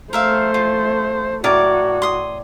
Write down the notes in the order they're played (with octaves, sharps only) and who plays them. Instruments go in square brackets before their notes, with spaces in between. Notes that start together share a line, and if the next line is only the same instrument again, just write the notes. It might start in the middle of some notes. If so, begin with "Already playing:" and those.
[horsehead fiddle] A3 C5 [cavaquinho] A#4 E5 F5
[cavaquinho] F4
[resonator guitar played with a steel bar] A2 D5 [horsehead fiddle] F#4 [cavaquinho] A#4
[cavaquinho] C6 D#6